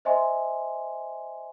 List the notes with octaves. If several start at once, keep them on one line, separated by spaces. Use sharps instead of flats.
C5 D#5 E5 G#5 C6